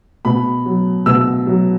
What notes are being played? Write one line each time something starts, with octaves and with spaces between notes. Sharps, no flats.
B2 B5
F#3
B2 E6
F#3